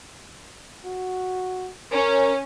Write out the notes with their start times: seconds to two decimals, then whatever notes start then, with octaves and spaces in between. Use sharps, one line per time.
0.85 F#4
1.92 C#4 A#4